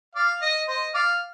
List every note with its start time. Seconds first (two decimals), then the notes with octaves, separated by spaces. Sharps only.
0.16 D5 F5
0.42 D#5
0.68 C5 D#5
0.95 D5 F5